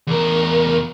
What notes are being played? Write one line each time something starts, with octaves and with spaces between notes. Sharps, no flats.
E2 A#4